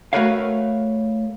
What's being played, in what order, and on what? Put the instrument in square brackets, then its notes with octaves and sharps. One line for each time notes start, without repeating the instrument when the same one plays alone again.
[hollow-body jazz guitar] A3 F#4 A#4 B4 C#5 F5